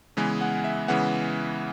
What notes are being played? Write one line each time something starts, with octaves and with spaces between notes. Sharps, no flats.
C#3 E3 G#3 B3 G#5
F#5
E5
C#3 E3 G#3 B3 F#5